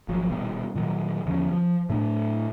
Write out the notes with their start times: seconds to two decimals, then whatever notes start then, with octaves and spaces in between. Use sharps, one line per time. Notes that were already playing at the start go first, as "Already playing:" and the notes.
0.08 G#1 F3 F#3
0.29 D#1 B2 G3 B3
0.75 A#2 D#3 F#3
1.26 E2 D3 F3 C#4
1.51 F3
1.90 A2 A3 D4